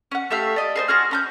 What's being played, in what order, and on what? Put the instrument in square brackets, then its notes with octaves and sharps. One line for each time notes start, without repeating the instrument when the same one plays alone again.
[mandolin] C#4 F#5
A3 G4 E5 F5
D5 D#5
G#4 A#4 C5
F4 F#4 G#4 F6
C#4 A#5 G6